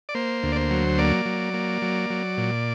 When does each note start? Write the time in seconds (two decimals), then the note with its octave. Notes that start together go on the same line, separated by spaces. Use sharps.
0.09 D5
0.15 A#3 C5
0.43 D2
0.52 D5
0.56 C5
0.70 F#3
0.98 A#3 D5
1.26 F#3
1.54 A#3
1.82 F#3
2.10 F#3
2.38 A#2